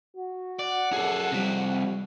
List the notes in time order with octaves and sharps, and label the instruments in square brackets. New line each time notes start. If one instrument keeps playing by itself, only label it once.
[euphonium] F#4
[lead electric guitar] D5 [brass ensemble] F#5
[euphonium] F#2 [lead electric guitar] G#4 A4
[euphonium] F2 [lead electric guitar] C3 G3